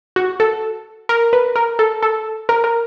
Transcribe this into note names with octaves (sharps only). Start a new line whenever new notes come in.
F#4
A4
A#4
B4
A#4
A4
A4
A#4
A#4